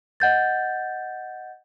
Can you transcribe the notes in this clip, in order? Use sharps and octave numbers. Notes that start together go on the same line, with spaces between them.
D#5 F#5 G6 A6